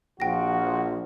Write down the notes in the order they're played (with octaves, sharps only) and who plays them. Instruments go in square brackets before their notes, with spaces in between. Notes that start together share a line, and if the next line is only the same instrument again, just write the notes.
[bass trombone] A#1 [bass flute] F3 [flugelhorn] F#4 [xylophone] G5 A#6